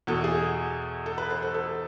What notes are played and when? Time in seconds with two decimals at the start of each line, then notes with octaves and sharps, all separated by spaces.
0.07 E2 B2 A4
0.24 G#4
1.06 A4
1.18 B4
1.30 C5
1.43 A4
1.54 A4